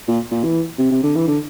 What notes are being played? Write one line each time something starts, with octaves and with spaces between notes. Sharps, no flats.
A#2
A#2
E3
C3
C3
D3
E3
D3